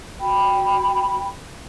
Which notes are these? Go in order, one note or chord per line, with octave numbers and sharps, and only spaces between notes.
F#4 G5 B5